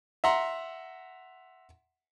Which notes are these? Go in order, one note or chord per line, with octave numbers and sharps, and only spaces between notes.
E5 F#5 A#5 C6